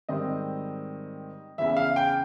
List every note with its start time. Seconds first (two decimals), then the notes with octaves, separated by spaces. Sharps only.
0.09 G#2 D#3 G3 C4 D#5
1.58 E2 C#3 E3 E5
1.69 E5
1.77 F5
1.96 G5